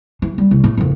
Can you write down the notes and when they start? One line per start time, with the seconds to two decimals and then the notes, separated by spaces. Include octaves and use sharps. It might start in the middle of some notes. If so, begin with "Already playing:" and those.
0.22 E3
0.38 G3
0.51 C2
0.64 A2
0.77 F#1 F2